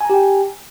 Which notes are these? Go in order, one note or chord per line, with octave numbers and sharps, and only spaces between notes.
G4 G5 G#5 A#5